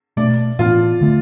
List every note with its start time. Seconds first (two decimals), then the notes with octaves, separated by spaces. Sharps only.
0.17 B2 A3 D4 D5
0.59 A2 E3 B3 D4 F4
1.01 D3 A3